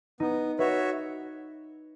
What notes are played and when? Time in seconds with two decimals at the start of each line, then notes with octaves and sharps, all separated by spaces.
0.20 B3 D#4
0.59 F#4 B4 C#5 E5